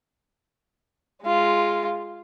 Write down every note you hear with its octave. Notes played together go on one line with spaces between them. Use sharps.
G#3 F4